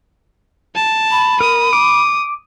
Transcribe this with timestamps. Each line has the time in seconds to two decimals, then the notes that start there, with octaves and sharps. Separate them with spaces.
0.75 A5
1.11 B5
1.40 A#4 D#6
1.73 D6